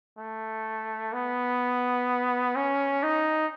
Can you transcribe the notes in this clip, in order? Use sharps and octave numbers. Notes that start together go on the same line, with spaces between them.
A3
B3
C#4
D#4